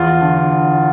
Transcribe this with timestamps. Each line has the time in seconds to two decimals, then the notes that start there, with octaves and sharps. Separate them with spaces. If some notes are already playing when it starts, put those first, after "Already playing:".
Already playing: E2 F4
0.21 D3